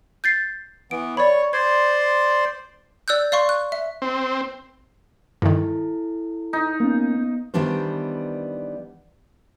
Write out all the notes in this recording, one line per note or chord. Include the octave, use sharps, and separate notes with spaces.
G6 A6 C7
E3 B3 D7
C#5 D5 B5
C5 D5 C6 G#6
D5 E6 F#6 G6
D5 F5 C6 C#6
F#6
E5
C4
G2 D#3 E4 A4
D#4
A#3 B3 C#4
D#3 E3 G3 B3 D4 C5